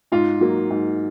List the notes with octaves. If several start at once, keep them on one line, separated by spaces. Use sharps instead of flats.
G#2 F4
F#3 A#3
G#2